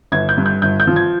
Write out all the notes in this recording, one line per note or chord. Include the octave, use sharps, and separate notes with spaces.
G1 G#6
G6
G2
G6
G1 G6
G6
F3
G#6